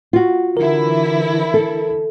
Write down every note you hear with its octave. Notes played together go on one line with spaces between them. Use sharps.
F4 F#4
D3 E3 E4 A#4
A4